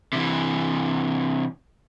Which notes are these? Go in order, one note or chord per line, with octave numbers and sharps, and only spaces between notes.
C3 E3